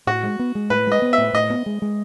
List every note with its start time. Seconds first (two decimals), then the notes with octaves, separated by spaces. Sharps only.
0.07 A2 F#4
0.23 G#3
0.39 B3
0.55 G#3
0.70 A2 B4
0.87 G#3 D#5
1.02 B3
1.13 E5
1.18 A2
1.33 A2 D#5
1.50 B3
1.66 G#3
1.82 G#3